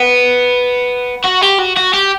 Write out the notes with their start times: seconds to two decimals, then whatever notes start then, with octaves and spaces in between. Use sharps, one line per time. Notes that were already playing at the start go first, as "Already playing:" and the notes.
Already playing: B3
1.25 F#4
1.42 G4
1.59 F#4
1.76 F#4
1.93 G4